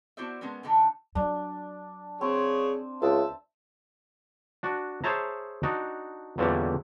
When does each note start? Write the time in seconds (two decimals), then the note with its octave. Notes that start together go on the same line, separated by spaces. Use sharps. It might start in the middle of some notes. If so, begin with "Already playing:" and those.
0.17 B3 E4 F#4 C5 D5 E5
0.41 G#3 B3 C#4 A#4
0.63 A2 D3 E3 D4 D#4 A4
1.15 F#3 D4
2.21 C4 G#4 C#5
3.02 C#2 E5 A5
4.63 D4 F#4
5.04 G#4 C5 C#5 E5 A5 A#5
5.63 D4 D#4 F#4
6.38 E2 A#2 D3 E3 G3 C#4